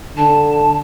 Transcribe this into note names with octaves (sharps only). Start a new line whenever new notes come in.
D3 A5